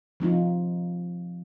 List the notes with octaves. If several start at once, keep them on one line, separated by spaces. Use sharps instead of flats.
F3 C4 D#4 F4